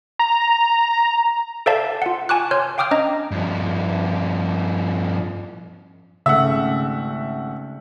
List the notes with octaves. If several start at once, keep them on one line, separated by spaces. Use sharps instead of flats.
A#5
A4 C5 D5 E5 F5 A5
F4 F#5
G#5 A5 C#6 D6 F#6
C#5 C6 F6 G6
F5 G5 D6 D#6 F6 G6
C#4 D4 D#5 A#5
G2 F3
G#1 C#3 A3 E5 F#5 E6